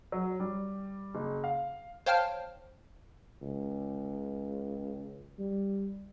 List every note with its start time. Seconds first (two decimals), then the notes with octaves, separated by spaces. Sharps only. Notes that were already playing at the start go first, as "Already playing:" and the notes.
0.12 F#3
0.40 G3
1.15 F#1
1.44 F5
2.06 C5 C#5 F5 G5 A5 F6
3.42 C#2
5.39 G3